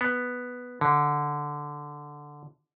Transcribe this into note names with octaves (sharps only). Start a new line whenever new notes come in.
B3
D3